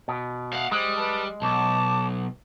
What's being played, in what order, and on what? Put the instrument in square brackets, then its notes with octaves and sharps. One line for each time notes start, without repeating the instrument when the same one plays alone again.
[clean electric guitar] B2
[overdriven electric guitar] F5 F#5
[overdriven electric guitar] G3 [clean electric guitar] G#3 [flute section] C5
[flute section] B4 A5
[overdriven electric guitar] B1 [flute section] A5 C#6 D6